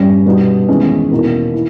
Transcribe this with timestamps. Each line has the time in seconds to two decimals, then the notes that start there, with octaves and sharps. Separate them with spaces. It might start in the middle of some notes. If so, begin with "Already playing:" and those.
Already playing: G2 G3 C#4
0.26 B2 G3 B3 D#4
0.68 E2 D#3 G#3 C#4 E4
1.11 E2 B2 A#3 D#4
1.54 E4